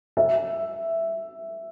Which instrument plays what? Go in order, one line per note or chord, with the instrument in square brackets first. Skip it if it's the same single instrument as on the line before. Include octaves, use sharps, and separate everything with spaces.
[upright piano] E5